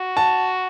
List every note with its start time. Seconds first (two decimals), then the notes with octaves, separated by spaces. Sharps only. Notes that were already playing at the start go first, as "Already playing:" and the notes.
Already playing: F#4
0.17 A5